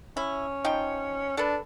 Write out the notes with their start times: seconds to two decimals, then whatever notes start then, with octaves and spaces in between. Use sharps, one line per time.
0.17 C#4 E4
0.64 F3 D#4 G5
1.37 D4 A4 B4